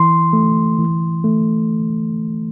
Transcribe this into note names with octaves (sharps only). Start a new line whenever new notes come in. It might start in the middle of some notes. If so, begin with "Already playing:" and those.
Already playing: E3 C6
A3
E3
A3